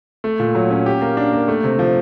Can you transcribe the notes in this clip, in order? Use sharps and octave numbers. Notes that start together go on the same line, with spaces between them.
A3
A#2
F#3
C#4
G4
A#3
D4
A#3
A3
C3
F3